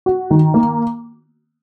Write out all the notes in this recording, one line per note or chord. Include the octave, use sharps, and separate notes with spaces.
F#4
D#3
A#3